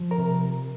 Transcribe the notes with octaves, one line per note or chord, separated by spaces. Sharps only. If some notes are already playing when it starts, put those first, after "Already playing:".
Already playing: F3
A#4 A#5
C3